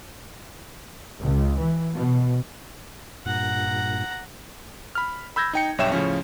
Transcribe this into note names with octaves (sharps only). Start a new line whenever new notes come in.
C#2
E3
B2
G2 A#2 F#5 A#5
B5 F6
B5 E6 G6 G#6 A#6
D#4 G5 C#7
B1 G2 C#5 E5 G5 E7
A2 C#3 F3 C#4